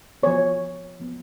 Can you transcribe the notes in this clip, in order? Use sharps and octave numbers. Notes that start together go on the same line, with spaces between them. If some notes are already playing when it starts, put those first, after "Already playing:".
F3 B3 C#5
F3 B3